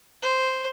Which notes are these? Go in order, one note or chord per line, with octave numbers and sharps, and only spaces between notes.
C5